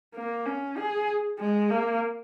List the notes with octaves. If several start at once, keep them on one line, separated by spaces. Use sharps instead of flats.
A#3
C#4
G#4
G#3
A#3